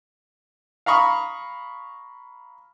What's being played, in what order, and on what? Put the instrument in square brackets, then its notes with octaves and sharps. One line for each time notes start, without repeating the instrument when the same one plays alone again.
[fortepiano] F5 A#5 B5 C#6 D#6